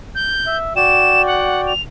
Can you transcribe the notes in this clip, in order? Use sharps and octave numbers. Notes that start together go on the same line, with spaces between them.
G6
E5
F#4 D5 G5 E7
F#5
F7